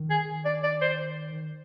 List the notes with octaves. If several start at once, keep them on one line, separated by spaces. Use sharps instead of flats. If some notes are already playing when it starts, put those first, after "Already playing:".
Already playing: D#3
G#4
D5
D5
C5